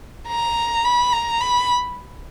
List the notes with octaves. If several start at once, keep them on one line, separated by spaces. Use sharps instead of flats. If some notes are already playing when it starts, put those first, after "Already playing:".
A#5
B5
A#5
B5